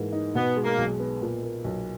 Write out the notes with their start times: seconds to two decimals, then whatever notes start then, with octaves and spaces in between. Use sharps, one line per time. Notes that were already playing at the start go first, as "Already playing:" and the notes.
Already playing: G#2 E3 G#3 A#3
0.12 D#4
0.35 B2 B3
0.57 G#3
0.64 A#3
0.78 B1
1.00 B3
1.22 A#2
1.43 A#3
1.64 B1